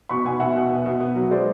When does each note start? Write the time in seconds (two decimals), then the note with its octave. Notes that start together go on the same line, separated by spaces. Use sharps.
0.09 B2 B5 C#6
0.25 B2 F#5 G#5
0.40 B2 E5 F#5
0.56 B2
0.70 B3
0.86 B2
1.00 B3
1.16 F#3
1.31 G#3 C5 D5